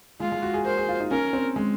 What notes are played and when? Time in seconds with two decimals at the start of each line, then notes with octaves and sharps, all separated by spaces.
0.20 G#3 F4
0.32 G#3
0.42 F#4
0.54 G#4
0.65 A#4 C5
0.77 G#4
0.89 F4
1.00 D#4
1.11 C#4 A#4
1.33 C4
1.56 G#3